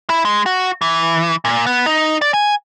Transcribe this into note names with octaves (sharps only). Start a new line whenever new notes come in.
E4
G#3
F#4
E3
A#2
B3
D#4
D5
G#5